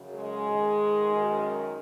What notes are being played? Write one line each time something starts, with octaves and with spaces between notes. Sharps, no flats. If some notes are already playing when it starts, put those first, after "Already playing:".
Already playing: F#2 C#3
G#3
G#2 D#3
F#2 D#3